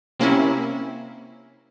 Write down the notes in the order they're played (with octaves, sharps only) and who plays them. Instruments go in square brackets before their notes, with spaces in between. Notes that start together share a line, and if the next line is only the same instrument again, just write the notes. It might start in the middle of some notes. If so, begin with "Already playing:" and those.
[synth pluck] C3 A#3 C#4 E4